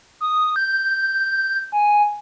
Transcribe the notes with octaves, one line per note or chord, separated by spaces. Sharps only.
D#6
G6
G#5